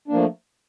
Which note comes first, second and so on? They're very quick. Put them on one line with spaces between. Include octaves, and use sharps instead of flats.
D4 A#3 F3 A3